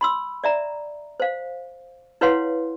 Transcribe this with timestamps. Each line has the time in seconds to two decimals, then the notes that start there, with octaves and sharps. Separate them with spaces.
0.01 B5 C6 E6
0.44 D5 E5 A#5
1.20 C5 F5
2.21 E4 B4 C#5 F5 F#5 C6